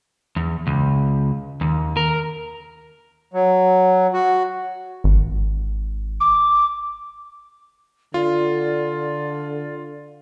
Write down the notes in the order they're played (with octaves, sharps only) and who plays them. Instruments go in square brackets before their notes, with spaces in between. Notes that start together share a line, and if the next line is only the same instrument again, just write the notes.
[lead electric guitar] E2
C#2
D#2
A#4
[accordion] F#3
F#4
[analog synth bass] G#1
[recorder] D6
[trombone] D3 [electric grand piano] F4 [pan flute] D5